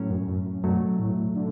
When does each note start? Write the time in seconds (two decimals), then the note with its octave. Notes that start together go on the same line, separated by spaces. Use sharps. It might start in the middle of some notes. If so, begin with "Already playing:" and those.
Already playing: A2 F#3 C#4
0.10 F#2
0.29 F#2
0.64 F#2 B2 F#3 A3
0.99 A2
1.35 D3